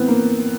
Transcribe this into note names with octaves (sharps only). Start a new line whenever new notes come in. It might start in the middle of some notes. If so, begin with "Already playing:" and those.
Already playing: A2 E3 B3 C4
A#3